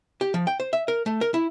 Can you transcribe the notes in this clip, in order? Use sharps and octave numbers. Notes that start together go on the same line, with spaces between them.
G4
F3
G5
C5
E5
A#4
A3
A#4
E4